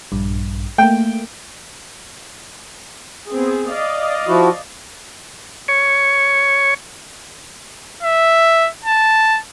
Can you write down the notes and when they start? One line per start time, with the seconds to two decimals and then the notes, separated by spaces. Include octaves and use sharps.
0.12 A#1 G2
0.78 A3 A#3 G5
3.30 B3 C4 G#4
3.72 D5 D#5 F5
4.28 F3 E4 F#4
5.68 C#5
8.03 E5
8.85 A5